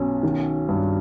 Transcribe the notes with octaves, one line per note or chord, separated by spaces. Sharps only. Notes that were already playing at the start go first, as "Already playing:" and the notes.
Already playing: B1 C#4
D#3
G2